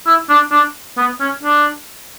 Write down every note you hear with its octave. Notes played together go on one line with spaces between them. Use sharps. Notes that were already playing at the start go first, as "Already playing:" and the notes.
E4
D4
D4
B3
C#4
D4